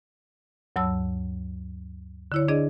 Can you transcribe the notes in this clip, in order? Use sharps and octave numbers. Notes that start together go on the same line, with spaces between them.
D2 G2 F#3 C#5 A5 E6
D3 E4 C#5
D4 G#4 D5 D#5